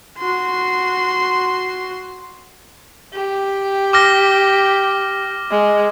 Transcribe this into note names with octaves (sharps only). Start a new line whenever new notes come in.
F#4 C6
G4
D6 F6 A#6
G#3